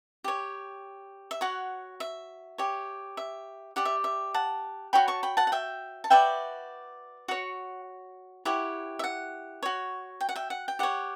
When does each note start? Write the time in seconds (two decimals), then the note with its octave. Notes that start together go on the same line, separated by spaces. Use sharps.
0.24 G4 C#5
1.31 E5
1.41 F#4 C#5 F#5
2.00 E5
2.58 G4 C#5
3.17 E5
3.76 G4 D5 F#5
3.85 E5
4.04 E5
4.34 F#5 A5
4.93 F#4 C#5 G5 B5
5.08 A5 C#6
5.23 G5 B5
5.37 F#5 A5
5.47 F#5
5.52 E5 G5
6.04 A5
6.10 F#4 B4 D5 E5 G5
7.28 F#4 C#5 F#5
8.45 E4 G4 C#5 F#5
8.99 E5
9.04 F#5
9.63 F#4 C#5
10.21 G5
10.29 F#5
10.36 E5 G5
10.50 F#5
10.68 G5
10.79 G4 C#5 F#5